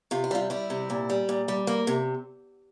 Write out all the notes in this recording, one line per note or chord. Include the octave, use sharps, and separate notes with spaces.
C3 F4
E4
G3 F4
G3 E4
C3
A#2
G3
A#2
G3
A#3
C3